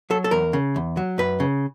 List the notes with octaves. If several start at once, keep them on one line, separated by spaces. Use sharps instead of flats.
F#3 A4
A4
E2 A#4
C#3
E2
F#3
F#2 B4
C#3